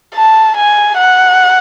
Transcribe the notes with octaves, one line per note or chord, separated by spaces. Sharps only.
A5
G#5
F#5